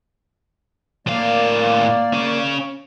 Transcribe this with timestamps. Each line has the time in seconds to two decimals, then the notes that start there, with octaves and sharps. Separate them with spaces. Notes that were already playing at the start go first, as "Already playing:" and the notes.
1.07 A2 A#3 D5 F5
2.13 C#4 F5